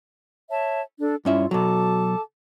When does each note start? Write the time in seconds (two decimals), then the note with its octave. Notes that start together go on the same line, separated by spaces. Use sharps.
0.50 C#5 E5 A5
1.00 D4 A4
1.25 G2 C#4 E4 F4 E5
1.51 B2 F#3 A4 A5 D6